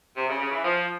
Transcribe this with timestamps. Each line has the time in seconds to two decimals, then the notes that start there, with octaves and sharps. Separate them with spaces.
0.16 C3
0.28 C#3
0.40 C#3
0.51 E3
0.65 F3